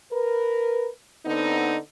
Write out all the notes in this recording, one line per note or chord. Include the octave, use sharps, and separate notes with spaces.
A#4 B4
D3 B3 C4 D#4